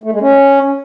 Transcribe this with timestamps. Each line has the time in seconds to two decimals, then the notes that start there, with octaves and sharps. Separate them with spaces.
0.04 A3
0.12 G#3
0.21 C#4